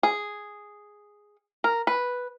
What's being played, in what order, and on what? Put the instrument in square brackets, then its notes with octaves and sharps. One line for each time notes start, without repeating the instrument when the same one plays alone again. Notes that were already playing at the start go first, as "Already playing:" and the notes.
[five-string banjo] G#4
A#4
B4